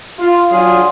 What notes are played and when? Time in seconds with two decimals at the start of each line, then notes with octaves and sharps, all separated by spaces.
0.18 F4
0.51 F#3 D4 F4 G#4